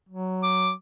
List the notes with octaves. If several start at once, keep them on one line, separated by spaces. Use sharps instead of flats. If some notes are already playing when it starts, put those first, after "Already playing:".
F#3
D6